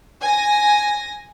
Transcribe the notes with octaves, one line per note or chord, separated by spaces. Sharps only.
G#5 A#6